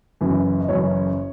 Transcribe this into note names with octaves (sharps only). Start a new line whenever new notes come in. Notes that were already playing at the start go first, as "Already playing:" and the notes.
F#1 F#2 E3
D#5
F#1 F#2 E3 C#5